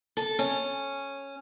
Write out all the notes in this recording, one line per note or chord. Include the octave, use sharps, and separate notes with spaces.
A4
C#4